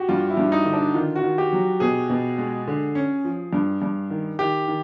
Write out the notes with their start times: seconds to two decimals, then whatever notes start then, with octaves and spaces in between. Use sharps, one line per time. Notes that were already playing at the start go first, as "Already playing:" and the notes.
Already playing: F#4 G4
0.09 G2 F4
0.30 E4
0.37 G2
0.52 D#4
0.65 D3
0.73 D4
0.94 D#3 F4
1.16 F#4
1.23 D#3
1.38 G4
1.53 F#3
1.80 B2 G#4
2.10 B2
2.38 G#3
2.67 D3
2.95 C#4
3.25 F3
3.53 G2
3.82 G2
4.10 D#3
4.39 D#3 G4
4.68 D#3